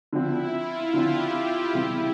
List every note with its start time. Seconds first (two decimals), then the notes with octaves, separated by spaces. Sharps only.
0.13 D3 F3 C4 E4
0.53 F4
0.93 D3 F3 C4 G4
1.33 F4
1.73 E2 C3 G3 E4